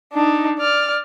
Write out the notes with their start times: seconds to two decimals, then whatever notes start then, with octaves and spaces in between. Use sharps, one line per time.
0.13 D4 D#4
0.59 D5 F6